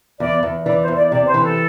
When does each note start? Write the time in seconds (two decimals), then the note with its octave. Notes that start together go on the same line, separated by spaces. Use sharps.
0.20 E2 D5
0.43 E2
0.66 E3 D5
0.81 C5
0.88 E2
0.97 D5
1.11 C3 D5
1.27 C5
1.34 E3
1.42 A4